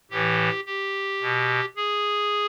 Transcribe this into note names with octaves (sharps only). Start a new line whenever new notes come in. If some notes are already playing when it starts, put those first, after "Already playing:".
A2 E3 G4
G4
B2
G#4